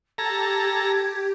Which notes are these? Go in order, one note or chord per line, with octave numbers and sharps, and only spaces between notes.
G4 A4 A#5 G#6